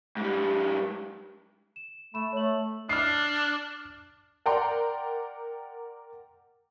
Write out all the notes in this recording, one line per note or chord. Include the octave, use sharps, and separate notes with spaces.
G#2 G3
E7
A3 B5 E7
A3 C#5 F#7
D4 F6 C7
A#4 D5 F#5 G5 A#5 C6